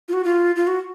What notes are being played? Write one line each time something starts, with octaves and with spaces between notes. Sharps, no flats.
F4
F#4
F4
F4
F#4